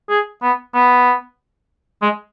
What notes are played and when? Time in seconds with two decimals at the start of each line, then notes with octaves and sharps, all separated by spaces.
0.10 G#4
0.43 B3
0.75 B3
2.02 G#3